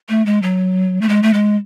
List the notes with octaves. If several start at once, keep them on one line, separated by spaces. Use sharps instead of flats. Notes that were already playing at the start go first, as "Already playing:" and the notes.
A3
G#3
F#3
A3
G#3
A3
G#3